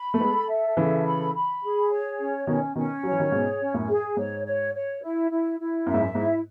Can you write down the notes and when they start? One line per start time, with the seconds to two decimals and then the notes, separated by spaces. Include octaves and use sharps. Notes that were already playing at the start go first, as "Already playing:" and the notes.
Already playing: B5
0.14 A3
0.20 G#3 B3 A4
0.49 E5
0.77 C#3 E3 A4
1.05 B5
1.34 B5
1.62 G#4
1.90 C#5
2.18 C#4
2.47 B2 D#3 C#4
2.75 B2 D#3 C#4
3.03 F#3 C#5
3.12 E3
3.19 D#3 F#3
3.32 G#2 B2 G#4
3.60 C#4
3.74 F#2 A2
3.88 G#4
4.16 G#2 C#5
4.45 C#5
4.73 C#5
5.02 E4
5.30 E4
5.58 E4
5.87 F#2 E5
5.94 G#2
6.01 F#2
6.15 G#2 E4